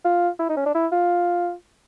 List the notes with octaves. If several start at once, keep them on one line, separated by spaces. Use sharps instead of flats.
F4
E4
D#4
C#4
D4
E4
F4